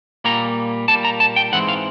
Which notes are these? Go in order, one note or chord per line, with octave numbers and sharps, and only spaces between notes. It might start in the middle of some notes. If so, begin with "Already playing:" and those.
A#2 G3 A#3 A#5
A#2 G3 A#3 A5
A#5
A5
G5
G#2 E3 G#3 C4 F#5
F5